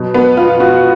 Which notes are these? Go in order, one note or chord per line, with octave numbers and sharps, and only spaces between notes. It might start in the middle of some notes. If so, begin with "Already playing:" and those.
Already playing: B2 F#3
B3
F4
F#4